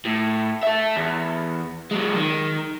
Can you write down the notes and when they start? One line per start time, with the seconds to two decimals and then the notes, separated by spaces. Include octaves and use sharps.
0.05 A2
0.63 A4 E5
0.96 E2
1.91 F#3 G#3
2.16 D#3